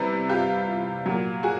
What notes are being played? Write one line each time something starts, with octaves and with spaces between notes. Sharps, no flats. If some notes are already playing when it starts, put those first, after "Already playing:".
Already playing: C3 E3 G3
F4 G4
A#2 F#3
F#4 G#4